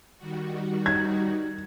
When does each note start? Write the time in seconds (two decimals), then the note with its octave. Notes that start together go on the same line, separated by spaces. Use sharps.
0.18 D#3 G3 F#4
0.86 D#4 G#6